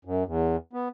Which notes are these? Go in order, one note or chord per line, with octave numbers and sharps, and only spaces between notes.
F#2
E2
B3